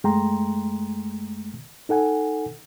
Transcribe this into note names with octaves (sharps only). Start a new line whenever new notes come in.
F#2 G#3 A3 G5 A#5 C6
D#4 A4 F#5 G#5